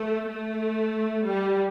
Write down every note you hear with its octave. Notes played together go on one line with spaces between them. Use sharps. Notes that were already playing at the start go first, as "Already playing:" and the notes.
Already playing: A3
A3
G3